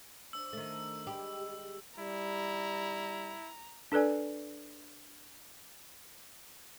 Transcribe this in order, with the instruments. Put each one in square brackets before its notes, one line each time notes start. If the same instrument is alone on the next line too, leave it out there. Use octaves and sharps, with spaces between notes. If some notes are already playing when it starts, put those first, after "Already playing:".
[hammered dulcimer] D4 C5 [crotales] E6
[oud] D#3 A3
[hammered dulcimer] D#3 G3 G#3 [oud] G4
[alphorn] G3 [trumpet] E4 [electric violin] A#5
[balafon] D4 A4 B4 D5 G#5